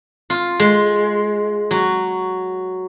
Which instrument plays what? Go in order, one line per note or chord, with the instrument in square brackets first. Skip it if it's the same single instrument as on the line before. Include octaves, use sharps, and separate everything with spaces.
[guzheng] F4
G#3
F#3